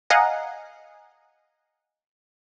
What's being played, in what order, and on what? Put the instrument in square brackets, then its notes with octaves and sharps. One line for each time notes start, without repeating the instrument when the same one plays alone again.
[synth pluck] D#5 F5 F#5 G#5 A#5